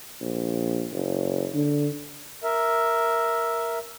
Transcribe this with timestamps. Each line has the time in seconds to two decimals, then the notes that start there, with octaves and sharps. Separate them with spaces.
0.21 A#1
0.92 F#1
1.54 D3
2.43 A#4 E5